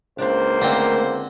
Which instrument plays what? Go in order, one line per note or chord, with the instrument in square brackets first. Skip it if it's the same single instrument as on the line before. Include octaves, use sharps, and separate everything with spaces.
[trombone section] C#2 A#3 C5 [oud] C4 D4
[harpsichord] D3 C4 [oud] A3 A#4